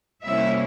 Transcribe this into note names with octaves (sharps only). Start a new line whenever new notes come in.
C3 G3 A#3 C#4 E4 E5